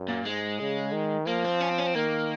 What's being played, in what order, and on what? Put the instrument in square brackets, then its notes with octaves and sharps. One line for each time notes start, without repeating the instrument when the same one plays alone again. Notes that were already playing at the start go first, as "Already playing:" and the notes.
Already playing: [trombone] F#2
[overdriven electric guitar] A#2
[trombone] G#2 [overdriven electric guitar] G#3
[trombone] C#3
D#3
[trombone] F3 [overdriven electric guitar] A#3
[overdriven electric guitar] C4
C#4
C4
C#4
C4
[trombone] D#3 [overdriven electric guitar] A#3